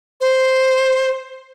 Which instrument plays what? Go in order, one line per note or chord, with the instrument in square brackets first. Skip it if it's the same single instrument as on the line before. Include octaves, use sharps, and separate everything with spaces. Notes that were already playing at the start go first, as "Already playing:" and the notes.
[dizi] C5